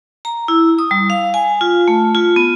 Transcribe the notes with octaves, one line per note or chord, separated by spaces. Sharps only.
A#5
E4
D#6
G3
F5
G#5
F4
A3
F4
B3